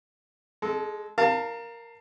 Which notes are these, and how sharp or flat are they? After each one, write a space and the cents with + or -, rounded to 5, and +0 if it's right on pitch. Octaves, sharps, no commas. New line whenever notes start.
G#3 +0 A4 -30
A#4 +0 F5 +0 A5 +30